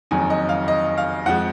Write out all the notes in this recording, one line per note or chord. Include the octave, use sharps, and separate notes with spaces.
F#1 F2 D#3 F#3 G#5
D#5
F5
D#5
F5
F2 F3 G#3 F#5